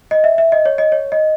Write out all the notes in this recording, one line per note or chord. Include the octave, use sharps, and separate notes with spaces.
D#5
E5
E5
D#5
C#5
D#5
C#5
D#5